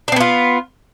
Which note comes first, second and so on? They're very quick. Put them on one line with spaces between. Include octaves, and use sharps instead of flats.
D4 C4 B3 F4